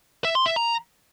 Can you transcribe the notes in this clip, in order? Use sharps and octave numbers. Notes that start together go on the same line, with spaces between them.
E5
C6
E5
A#5